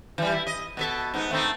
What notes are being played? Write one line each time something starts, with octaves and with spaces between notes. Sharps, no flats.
E3 G3
E4
D#5
B2 A4 E5
G#2 B3 D#4
A3 C4 D#4